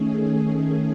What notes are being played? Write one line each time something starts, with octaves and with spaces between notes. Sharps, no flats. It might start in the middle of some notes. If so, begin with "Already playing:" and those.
Already playing: D#3 A3 C#4 G#4